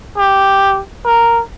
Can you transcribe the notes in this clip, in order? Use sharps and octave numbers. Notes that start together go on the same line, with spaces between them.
G4
A#4